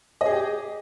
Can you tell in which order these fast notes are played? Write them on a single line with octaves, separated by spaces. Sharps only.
D#5 G#4 G4